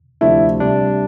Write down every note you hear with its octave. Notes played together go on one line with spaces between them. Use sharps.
D2 C3 F3 A3 D4 E4
C2 C3 G3 D4